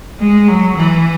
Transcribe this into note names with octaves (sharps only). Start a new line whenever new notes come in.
G#3
F#3
E3